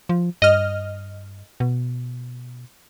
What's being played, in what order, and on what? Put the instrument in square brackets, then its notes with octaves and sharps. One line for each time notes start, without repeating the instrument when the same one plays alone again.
[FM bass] F3
[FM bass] G2 [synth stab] D#5 F6
[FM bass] B2